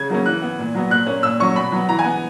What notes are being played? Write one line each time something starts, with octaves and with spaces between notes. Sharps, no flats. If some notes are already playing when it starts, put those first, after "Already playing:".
Already playing: C#3 G#6
F#3 A#3 C#4
E3 F#6
B3
A#2
F#3 B3
A#2 F#6
A#3 C#4
A#2 E6
F#3 C#4 C#6
B2 B5
F#3 B3
E3 A#5
G#5
B3